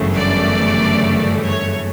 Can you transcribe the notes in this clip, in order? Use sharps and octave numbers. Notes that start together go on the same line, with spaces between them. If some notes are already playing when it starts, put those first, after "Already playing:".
Already playing: G1 F#2 C#3 E3 A3
D5
C#5